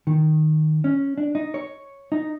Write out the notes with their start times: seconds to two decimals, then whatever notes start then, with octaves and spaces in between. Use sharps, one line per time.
0.07 D#3
0.84 C#4
1.18 D4
1.35 D#4
1.54 C#5
2.12 D#4